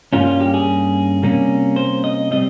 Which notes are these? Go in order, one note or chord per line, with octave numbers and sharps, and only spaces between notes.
G2 G3 A#3 C#4 F4
F4
G4
G#4
C3 G3 A#3 C#4
C5
D#5
G3 C4 D#5